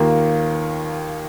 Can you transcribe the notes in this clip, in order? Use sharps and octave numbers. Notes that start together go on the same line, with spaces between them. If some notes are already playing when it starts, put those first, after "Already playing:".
Already playing: D#2 D#3 A#3 F4